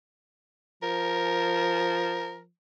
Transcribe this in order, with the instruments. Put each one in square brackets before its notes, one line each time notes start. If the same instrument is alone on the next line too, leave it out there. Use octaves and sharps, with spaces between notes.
[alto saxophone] F3 [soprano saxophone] A#4